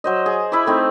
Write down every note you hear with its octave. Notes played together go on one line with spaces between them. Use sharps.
F#3 C5 D#5
G#4
E4 E5 B5 D6
A3 C4 D#4